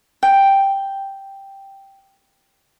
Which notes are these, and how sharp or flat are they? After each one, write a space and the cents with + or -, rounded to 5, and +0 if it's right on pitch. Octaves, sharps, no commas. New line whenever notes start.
G5 +0